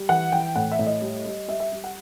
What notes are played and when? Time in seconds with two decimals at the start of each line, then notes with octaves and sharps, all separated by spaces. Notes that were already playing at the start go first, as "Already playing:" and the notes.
Already playing: G3
0.09 E3 F#5
0.32 E3 G5
0.56 A2 F#5
0.72 E5
0.79 A2
0.86 D#5
1.02 G3
1.26 G3
1.48 G3 E5
1.60 E5
1.72 G3
1.84 F#5